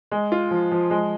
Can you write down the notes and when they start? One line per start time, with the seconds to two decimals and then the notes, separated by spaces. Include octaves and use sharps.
0.12 G#3
0.32 F4
0.51 F3
0.72 F3
0.91 G#3